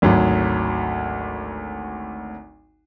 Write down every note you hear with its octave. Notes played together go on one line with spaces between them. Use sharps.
G#1 D2 F#3